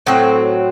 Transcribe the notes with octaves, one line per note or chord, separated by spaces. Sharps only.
A2 F#3 C4 F#4